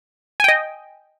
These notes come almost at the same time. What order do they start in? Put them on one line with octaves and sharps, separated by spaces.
G#5 G5 D#5